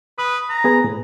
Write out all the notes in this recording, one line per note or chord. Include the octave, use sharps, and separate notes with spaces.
B4 D#6
A#5
B3 G#4 B4
A2